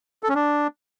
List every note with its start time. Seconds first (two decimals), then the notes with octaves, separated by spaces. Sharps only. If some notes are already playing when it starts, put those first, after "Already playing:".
0.23 A4
0.29 C#4
0.35 D4